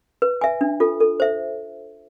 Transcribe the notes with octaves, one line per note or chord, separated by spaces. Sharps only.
B4
E5 G#5
D4
F4 A4
A4
C5 E5